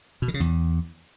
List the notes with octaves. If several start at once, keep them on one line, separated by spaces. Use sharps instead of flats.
B2
D#3
C#3
E2